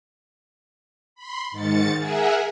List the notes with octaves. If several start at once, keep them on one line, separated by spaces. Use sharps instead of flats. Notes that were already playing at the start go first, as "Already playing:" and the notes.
B5 C6
G#2 D#3 A6 C#7
G#4 A#4 E5 F#5 G#5